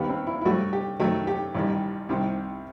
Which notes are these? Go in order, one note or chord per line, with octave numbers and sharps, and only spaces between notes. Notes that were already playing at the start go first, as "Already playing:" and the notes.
Already playing: D#2 D#3 G3 B3
C4
E4
E4
G2 F#3 A3 F#4
G4
F#2 D#3 F#3 A3
G4
A1 G2 D#3 G3
C2 C3 D#3